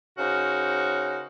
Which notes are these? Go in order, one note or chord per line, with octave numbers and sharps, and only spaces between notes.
C#3 D#4 F#4 A#4 C5 C#5